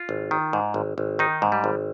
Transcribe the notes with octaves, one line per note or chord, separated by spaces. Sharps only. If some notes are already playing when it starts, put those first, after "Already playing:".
Already playing: F4
G#1
D#3
G#2
G#1
G#1
D#3 D#4
G#2
G3
G#1